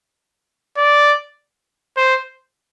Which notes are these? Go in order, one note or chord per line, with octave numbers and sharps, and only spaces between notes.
D5
C5